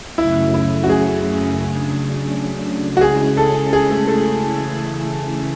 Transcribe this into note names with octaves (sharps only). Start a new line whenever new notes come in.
F#2 C#3 F#3 A3 C#4 E4
E4
F#4
G#4
C#3 F#3 A3 D4
F#4
C#3 G#3 C#4 E4 G#4
A4
G#4
A3
A3
C#3 E3 A3 E4